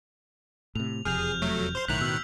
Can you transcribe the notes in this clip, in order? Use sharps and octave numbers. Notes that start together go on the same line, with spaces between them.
A2 C3 F7
E1 F2 C3 G#4 F6 G6 F7
F#3 A3
C5 C6
B1 A2 D#3 F#6 B6 F7
B2 E6